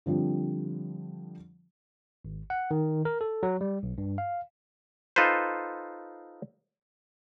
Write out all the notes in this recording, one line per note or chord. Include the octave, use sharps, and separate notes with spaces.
D3 F3 G3 C4
G#1
F#5
D#3
A#4
A4
F#3
G3
B1
G2
F5
D#4 F4 A4 B4 C5